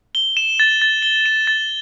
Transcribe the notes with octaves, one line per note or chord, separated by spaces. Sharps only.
G7
E7
A6
A6
G7
E7
A6